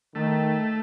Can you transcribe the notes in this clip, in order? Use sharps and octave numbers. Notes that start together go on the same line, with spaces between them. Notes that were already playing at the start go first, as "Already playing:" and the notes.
D#3 A3